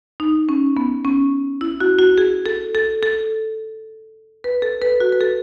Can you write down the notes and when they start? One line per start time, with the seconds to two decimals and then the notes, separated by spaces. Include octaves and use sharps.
0.20 D#4
0.49 C#4
0.77 B3
1.05 C#4
1.61 E4
1.80 F#4
1.99 F#4
2.18 G#4
2.46 A4
2.75 A4
3.03 A4
4.44 B4
4.62 A4
4.82 B4
5.00 F#4
5.12 B4
5.21 A4